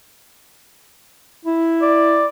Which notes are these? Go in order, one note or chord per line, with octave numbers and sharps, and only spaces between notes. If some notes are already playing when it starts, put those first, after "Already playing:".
E4
D5